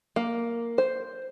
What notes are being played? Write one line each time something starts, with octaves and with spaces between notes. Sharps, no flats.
A#3
C5